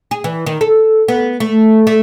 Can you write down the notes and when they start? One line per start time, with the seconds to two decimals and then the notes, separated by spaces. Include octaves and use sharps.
0.11 G#4
0.24 E3
0.46 D#3
0.61 A4
1.08 B3
1.40 A3
1.87 A3